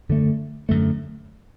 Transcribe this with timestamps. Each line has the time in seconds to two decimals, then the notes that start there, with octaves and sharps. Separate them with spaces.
0.09 F#2 D3 A3
0.69 F#2 D3 A3